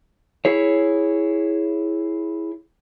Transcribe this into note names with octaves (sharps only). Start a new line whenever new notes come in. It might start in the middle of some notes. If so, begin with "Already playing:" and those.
E4 G#4 C#5